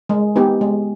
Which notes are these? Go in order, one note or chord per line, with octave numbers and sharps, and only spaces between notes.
G#3
B3 D#4 G4
G#3